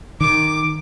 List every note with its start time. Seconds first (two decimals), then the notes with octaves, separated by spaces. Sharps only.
0.21 D#3 D6